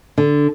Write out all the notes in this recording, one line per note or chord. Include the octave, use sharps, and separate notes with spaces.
D3